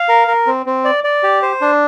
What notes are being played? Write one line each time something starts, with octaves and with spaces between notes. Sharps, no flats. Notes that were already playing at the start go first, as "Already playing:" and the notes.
Already playing: F5
A#4
A#4
C4
C4
D5
D5
G4
C5
D4